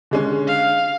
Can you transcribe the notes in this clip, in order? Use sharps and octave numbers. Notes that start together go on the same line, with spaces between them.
D3 G#3 C#4
F5